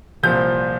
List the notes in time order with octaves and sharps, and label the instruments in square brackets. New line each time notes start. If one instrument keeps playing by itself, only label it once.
[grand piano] C2 A#2 F3 G6